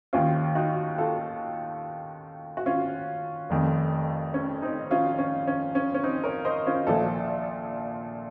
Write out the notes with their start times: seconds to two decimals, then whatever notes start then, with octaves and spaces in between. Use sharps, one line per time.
0.13 D#2 D#3 C#4 F4
0.55 D#4 F#4
0.98 F4 A4
2.57 F#4
2.66 C#4 F4
3.50 F1 F2 D#3
4.34 C#4
4.62 C4 D#4
4.91 C#4 F4
5.19 C#4
5.47 C#4
5.75 C#4
5.94 C#4
6.04 C4 D#4
6.24 A#4 C#5
6.45 C5 D#5
6.66 C#4 F4
6.87 A#1 A#2 F3 F4 A4